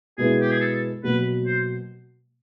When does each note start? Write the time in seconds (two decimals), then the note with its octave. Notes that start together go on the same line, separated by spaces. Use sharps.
0.18 B2 G#3 B3 E4 G#4
0.41 G4
0.51 G#4
0.61 A4
1.03 B2 F#3 A#3 B4
1.46 C5